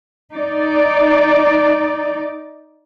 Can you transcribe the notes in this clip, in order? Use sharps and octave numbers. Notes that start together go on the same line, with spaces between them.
D#4 D5